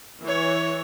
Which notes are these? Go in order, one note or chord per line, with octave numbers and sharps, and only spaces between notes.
E3 C#5